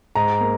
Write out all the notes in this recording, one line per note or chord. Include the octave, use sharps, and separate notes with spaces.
G#2 A#5
A#3